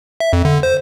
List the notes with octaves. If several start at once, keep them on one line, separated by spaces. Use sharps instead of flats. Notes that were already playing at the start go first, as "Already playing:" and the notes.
E5
F2
D3
C5